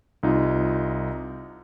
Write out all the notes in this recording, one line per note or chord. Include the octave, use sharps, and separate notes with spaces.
C2 D#4 F4